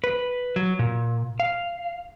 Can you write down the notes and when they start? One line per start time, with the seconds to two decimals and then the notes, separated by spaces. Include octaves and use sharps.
0.04 B4
0.56 F#3
0.79 A#2
1.40 F5